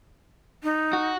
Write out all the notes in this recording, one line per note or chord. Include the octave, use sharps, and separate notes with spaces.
D#4
F#4